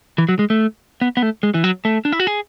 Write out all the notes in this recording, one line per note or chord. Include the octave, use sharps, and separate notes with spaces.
E3
F#3
G#3
A3
B3
B3
A3
G#3
E3
F#3
A3
D4
E4
F#4
G#4